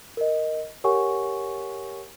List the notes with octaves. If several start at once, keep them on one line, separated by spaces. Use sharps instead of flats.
A#4 D#5
G4 A#4 C#5 F#5 G#5 C#6